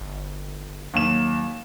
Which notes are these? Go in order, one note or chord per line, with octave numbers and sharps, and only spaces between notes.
G1
D#2 F#3 E7